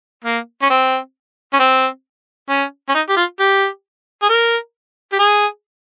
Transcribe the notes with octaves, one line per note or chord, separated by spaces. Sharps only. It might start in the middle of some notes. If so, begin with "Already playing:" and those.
A#3
C#4
C4
C#4
C4
C#4
C#4
D#4
G4
F4
G4
G#4
A#4
G4
G#4